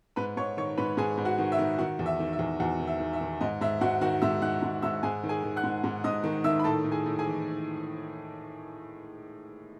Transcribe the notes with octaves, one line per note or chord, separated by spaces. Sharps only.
G#2 B4 B5
G#2 C#5 C#6
D#3 C#5 C#6
G#2 B4 B5
G#2 G#4 G#5
G#2
F#4 F#5
D#3
E5
D#3
D#3 F#4 F#5
E2
E5
D#3
E5
E2
E2 F#4 F#5
D#3
E5
D#3
E5
D#3
G#2 D#5
G#2 E5
G#2 F#4 F#5
D#3 F#4 F#5
G#2 E5 E6
D#3 F#5 F#6
G#2
G#2 E5 E6
G#2 G#4 G#5
D#3
G#4 G#5
D#3
F#5 F#6
G#2
G#2
G#2 D#5 D#6
D#3
D#3 E5 E6
B5
A2 A4 A5
A2
G#4 G#5
A2
G#4 G#5
E3